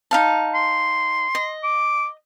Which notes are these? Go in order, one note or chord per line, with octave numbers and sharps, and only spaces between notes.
D#4 F5 A5
C6
D#5
D6